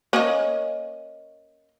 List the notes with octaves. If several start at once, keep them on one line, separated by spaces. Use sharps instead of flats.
A#3 C#4 D#5